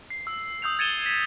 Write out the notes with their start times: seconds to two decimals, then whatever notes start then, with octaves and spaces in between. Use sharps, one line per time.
0.10 C7
0.27 E6
0.62 D#6 E6 G6 C7 F7
0.79 G#6 A6 C#7 D#7 E7 G7
1.06 B6